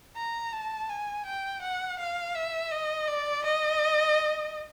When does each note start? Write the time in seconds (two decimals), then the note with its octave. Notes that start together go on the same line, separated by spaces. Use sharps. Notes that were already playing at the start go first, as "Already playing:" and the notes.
0.17 A#5
0.53 A5
0.89 G#5
1.26 G5
1.62 F#5
1.99 F5
2.35 E5
2.71 D#5
3.07 D5
3.45 D#5